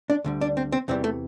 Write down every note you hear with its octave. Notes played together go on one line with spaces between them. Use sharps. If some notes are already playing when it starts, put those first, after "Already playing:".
D4
D2 D3 G3
D4
C4
C4
E2 C3 E3 G3 C4
A3